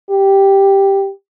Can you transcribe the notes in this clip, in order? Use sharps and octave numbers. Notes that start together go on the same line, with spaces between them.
G4